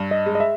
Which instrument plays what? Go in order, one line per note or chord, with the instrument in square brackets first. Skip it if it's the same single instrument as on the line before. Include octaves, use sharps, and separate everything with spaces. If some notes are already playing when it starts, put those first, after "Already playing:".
Already playing: [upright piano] G2
[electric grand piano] D#5
[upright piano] G#3
[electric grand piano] D#5
E5